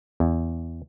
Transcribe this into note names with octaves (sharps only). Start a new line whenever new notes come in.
E2